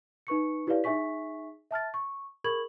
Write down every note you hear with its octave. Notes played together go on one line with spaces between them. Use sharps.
D#4 B4 C#6 C#7
E4 G4 B4 C#5 D5 F5
D#4 G#4 E5 G#5 C#6 B6
E5 A5 F6 A6
C#6
G#4 A#4 B5 C#6 G#6 F#7